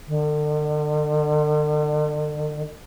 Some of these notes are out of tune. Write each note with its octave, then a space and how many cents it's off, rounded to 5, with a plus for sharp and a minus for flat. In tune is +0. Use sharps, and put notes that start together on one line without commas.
D3 +40